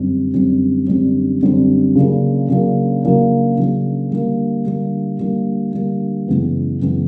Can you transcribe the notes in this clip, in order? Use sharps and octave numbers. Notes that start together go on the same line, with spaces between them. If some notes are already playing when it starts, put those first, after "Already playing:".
Already playing: F#2 D3 G3 C4
F#2 D3 G3 C4
F#2 D3 G3 C4
F#2 D3 G3 C4
C#3 F#3 A#3 D4
C#3 F#3 A#3 D4
C#3 F#3 A#3 D4
C#3 F#3 A#3 D4
D3 G3 A#3
D3 G3 A#3
D3 G3 A#3
D3 G3 A#3
F#2 C#3 E3 G#3 B3
F#2 C#3 E3 G#3 B3